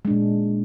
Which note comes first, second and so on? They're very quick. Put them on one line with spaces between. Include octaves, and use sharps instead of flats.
G#3 D4 A#2